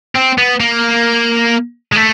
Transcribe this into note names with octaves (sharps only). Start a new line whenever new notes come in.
C4
B3
A#3
G#3
A3